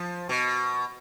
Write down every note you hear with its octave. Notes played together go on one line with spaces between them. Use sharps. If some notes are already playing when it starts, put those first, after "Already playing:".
Already playing: F3
B2